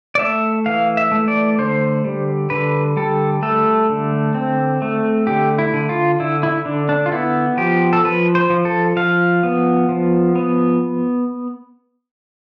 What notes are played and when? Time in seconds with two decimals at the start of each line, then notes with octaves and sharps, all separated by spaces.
0.15 D5
0.19 A3 E5
0.66 E3 F5
0.97 E5
1.11 A3
1.28 D5
1.58 D3 C5
2.04 G3
2.50 D3 B4
2.97 G3 A4
3.42 A3 A4
3.89 D3
4.34 C4
4.82 A3
5.27 D3 G4
5.58 E4
5.73 D3
5.89 F4
6.20 D3 E4
6.43 E4
6.65 D3 D4
6.89 D4
7.06 F4
7.12 B3 E4
7.57 F3 G4
7.93 A4
8.04 F3 B4
8.35 C5
8.50 F3
8.65 A4
8.96 F3 F5
9.43 B3
9.89 F3
10.36 B3